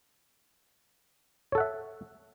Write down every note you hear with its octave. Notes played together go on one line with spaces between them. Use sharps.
A4 C#5 E5 F#5